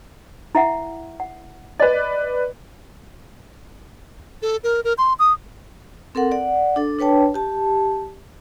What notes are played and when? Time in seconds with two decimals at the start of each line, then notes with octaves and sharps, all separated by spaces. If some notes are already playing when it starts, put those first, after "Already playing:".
0.55 E4 E5 F#5
1.20 F#5
1.80 B4 D5 D#5
4.42 A4
4.64 A#4
4.84 A#4
4.98 C6
5.19 D#6
6.15 C4 A4 A#4 F#5
6.31 D5 F#5
6.76 D4 A4
6.99 D4 B4 C#5 G5 A5
7.34 G4 A5